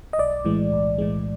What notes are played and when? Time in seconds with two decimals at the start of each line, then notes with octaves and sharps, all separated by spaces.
0.13 D#5
0.19 B1 D5
0.45 A2 E3 G#3
0.72 B1
0.98 A2 E3 G#3